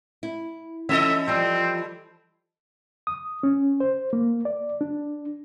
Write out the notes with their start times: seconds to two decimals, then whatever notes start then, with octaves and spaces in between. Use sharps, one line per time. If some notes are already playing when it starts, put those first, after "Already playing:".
0.23 E4
0.89 E3 C#4 A4 D#5 E5
1.28 F3 G3 C4
3.07 D#6
3.43 C#4
3.80 C5
4.13 A#3
4.45 D5
4.81 D4